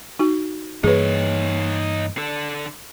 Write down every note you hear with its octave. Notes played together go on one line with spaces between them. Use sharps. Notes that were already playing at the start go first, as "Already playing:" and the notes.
D#4 F#4
G2 E3 A#3 D#4 G#4 B4 C#5
D3 A4